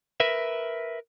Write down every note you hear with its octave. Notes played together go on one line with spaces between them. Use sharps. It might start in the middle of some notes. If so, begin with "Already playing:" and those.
A#4 B4 E5